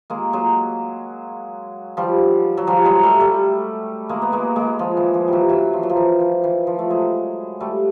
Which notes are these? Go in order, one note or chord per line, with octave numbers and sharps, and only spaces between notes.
G#3 A#3
F#3 G#3
F3 G3
F#3
F3 G3
F#3 G#3
G3 A3
G3 A3
G#3 A#3
B3
G#3 A#3
G#3 A#3
F3
E3
F3
E3 F#3 G3
E3 F#3
F3
F#3
F3
E3
F3
E3
F3
A3
F#3 G#3
G3 A3